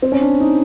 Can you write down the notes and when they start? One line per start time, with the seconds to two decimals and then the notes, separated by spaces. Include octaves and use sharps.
0.02 C4
0.12 C#4
0.21 D4
0.40 D#4